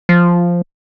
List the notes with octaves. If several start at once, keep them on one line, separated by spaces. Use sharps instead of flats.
F3